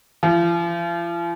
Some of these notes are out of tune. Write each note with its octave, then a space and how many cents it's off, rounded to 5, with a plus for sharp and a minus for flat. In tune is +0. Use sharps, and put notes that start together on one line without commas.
F3 -40